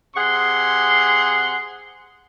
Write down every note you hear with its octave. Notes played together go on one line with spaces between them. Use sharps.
C3 G#4 F#5 C6